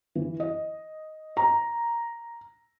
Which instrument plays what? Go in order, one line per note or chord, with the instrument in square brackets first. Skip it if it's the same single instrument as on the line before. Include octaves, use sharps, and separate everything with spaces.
[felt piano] E3
D#5
A#5